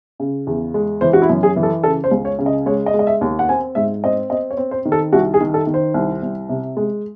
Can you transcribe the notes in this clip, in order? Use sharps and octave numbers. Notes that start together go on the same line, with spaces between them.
C#3
E2
G#3
E3 C5
F#4
E4
F#2
G#4
E3
A4
C#3 A4
C5
C#2
C#5
C#3
D#5
G#3 C#5
D#5
G#3
D#5
E5
D#2
F#5
C4 G#5
G#2 E5
C4 D#5
C4 D#5
C#5
C4
C5
D#3
A4
C2 F#4
G#4
D#3
A4
D#3
C5
C2
C2
C3
G#3